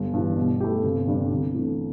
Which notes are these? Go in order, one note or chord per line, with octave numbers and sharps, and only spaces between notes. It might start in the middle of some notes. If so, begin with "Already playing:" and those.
Already playing: G1 G3
G2 E3
B2
A3 E4 G4
G1 C3
G2 D3 G3
C2 D3
C3 E3 A3